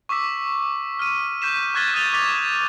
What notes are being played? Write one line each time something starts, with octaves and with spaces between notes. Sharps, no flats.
C#6 D6 E6 B6
F6 D#7
C#6 G6 B6 E7
C#6 F#6 G#6 A6 B6 G7
D#6 G6 A6 D#7 F7 G7
D6 A6 B6 F7 G7